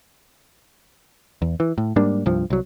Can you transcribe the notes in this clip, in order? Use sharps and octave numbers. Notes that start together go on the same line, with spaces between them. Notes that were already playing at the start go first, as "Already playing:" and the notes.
E2
E3
A2
G#2 G3 A#3 D4
C2 G2 F3
C2 F#3